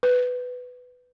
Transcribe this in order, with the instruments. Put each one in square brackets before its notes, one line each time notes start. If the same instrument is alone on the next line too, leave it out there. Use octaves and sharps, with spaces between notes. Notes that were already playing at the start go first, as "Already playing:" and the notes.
[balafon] B4